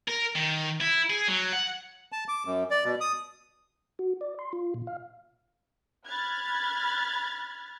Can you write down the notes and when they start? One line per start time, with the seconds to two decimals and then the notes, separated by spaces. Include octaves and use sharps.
0.08 A#4
0.36 D#3
0.81 E4
1.10 G#4
1.28 F#3
1.53 F#5
2.12 A5
2.28 D6
2.46 F#2
2.71 D5
2.84 B2
3.01 D#6
3.99 F#4
4.21 D5
4.39 C6
4.53 F4
4.74 A#2
4.87 F5
6.09 B5 F6 F#6 G#6 A6